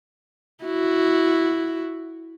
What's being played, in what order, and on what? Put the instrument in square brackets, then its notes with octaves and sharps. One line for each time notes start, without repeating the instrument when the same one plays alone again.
[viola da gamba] E4 F#4